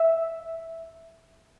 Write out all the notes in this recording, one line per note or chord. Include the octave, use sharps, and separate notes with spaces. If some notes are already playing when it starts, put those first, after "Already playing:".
Already playing: E5